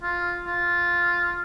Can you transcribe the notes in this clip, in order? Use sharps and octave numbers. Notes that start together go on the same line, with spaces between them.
F4
F4